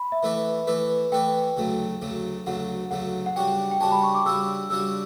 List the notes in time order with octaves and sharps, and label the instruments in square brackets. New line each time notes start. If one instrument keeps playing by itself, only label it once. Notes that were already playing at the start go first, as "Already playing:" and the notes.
Already playing: [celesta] B5
E5
[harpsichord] E3 A3 E4 B4 D5
E3 A3 E4 B4 D5
[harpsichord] E3 A3 E4 B4 D5 [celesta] G5
[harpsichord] D2 C#3 F#3 A3
D2 C#3 F#3 A3
[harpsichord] D2 C#3 F#3 A3 [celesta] F#5
[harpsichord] D2 C#3 F#3 A3 [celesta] F#5
[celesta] F#5
[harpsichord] C#3 G3 D4 F#4 C#5 [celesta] G5
[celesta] G5
[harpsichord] C#3 G3 D4 F#4 C#5 [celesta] A5
[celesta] B5
C#6
D6
[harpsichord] C#3 G3 D4 F#4 C#5 [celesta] E6
[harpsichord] C#3 G3 D4 F#4 C#5 [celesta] E6